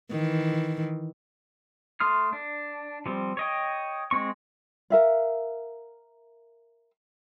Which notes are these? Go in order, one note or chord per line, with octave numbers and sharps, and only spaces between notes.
D#3 E3
A3 C6 D#6 F6
D4
F3 G3 C4
C#5 D#5 G5
G#3 C4 C#6
A#4 E5 F5